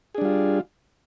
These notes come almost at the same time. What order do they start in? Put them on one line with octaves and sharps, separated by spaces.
G#4 D4 G3 F4